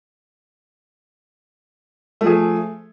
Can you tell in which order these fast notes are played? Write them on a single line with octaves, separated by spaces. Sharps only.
A3 F3 G#4